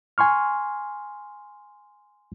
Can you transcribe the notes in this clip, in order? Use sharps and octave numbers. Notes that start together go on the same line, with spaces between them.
G#5 C6 C#6 F6